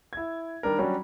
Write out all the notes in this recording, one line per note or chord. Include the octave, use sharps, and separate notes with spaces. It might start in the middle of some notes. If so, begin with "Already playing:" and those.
E4 G#6
D#3 G3 D4 A#4
F#3 G3 C#4 D4 F#4